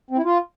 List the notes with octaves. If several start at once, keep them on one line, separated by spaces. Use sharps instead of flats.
C4
E4
F4